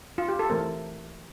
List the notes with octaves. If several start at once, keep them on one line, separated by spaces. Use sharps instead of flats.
F4
G4
A4
E3 A3 C4 A#4